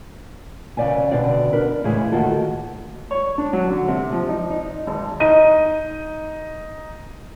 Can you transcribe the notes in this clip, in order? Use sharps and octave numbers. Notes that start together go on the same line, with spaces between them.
D#2 C#3 A3 D5 E5 G#5
B2 D3 B3 C4 D5
D4 A#4 B4
A2 C#3 E3 G#3 E4 G#4
D2 D#3 A#3 F4 F#4 A4
C#5
D4
F#3
D3
C3
F3
D#4
D#4
G#1
D#4 D#5 D#7